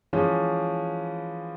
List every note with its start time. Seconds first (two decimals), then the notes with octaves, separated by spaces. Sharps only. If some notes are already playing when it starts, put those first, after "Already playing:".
0.13 E3 F3 G#3 C#4